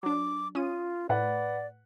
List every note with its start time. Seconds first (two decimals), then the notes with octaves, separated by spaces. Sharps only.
0.03 F#3 D4 D6
0.55 C#4 F4 D#6 D#7
1.09 A2 B4 D5 F#5